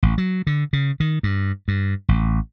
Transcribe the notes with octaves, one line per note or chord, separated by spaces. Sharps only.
A1
F#3
D3
C#3
D#3
G2
G2
A1